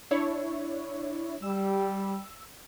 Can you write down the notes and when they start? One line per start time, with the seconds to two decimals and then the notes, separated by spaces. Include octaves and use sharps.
0.11 D4 E4 C#5
1.42 G3 E6